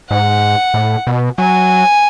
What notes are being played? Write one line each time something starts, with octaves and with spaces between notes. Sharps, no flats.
G#2 F#5
A2
B2
F#3 G#5